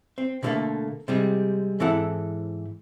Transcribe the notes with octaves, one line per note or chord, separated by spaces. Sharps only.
C4
B2 D3 F3 G3 A3 A#3
C3 G3 G#3
G#2 E3 C4 E4 A4 F#5